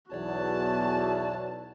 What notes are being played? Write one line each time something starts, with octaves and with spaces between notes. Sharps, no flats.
B1 E2 F#4 C#5 D5 A5